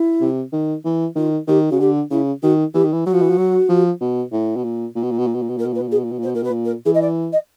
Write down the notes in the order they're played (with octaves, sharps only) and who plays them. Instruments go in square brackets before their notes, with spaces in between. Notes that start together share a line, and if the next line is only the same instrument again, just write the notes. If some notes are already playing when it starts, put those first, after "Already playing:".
Already playing: [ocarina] E4
[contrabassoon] C3
D#3
E3
[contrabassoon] D#3 [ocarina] F4
[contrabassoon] D#3 [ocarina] G4
[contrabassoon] C#3 [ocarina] F#4
[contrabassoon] D3 [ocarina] G4
[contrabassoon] C#3 [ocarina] E4
[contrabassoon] D#3 [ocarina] F#4
[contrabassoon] E3 [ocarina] G4
[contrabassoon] D#3
E3
[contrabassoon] F#3 [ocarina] F#4
[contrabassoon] F3
E3
F3
F#3
F3
B2
A2
B2
A#2
A#2
B2
A#2
B2
A#2
B2
A#2
B2
[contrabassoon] A#2 [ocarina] A#4
[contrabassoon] B2
[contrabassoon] A#2 [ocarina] B4
[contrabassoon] B2
A#2
[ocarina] G#4
[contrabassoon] B2
A#2
B2
A#2
[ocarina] C5
[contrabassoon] B2
[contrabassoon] A#2 [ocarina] A#4
[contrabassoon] B2 [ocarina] B4
[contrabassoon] A#2
[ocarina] A#4
[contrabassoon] E3 [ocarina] G#4
[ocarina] D#5
D5
D#5